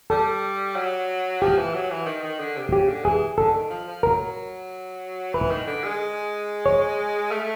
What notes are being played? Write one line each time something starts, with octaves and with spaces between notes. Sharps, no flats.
G3 A4
F#3
F3 G4
E3
F#3
E3
D#3
D#3
D3
C3
C#3 G4
D3
E3 G#4
D3 A4
D#3
F3
F3
F#3 A#4
E3 B4
D#3
D3
G#3
C#5
A3